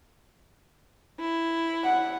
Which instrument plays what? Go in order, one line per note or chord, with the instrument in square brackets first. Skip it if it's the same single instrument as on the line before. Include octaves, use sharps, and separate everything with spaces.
[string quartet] E4
[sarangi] F#5